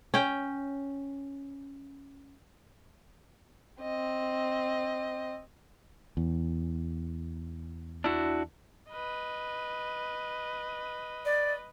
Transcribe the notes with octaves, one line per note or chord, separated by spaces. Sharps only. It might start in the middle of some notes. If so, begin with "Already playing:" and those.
C#4 G5
C4 D#5
E2
D4 E4 F#4
B4 D#5
D5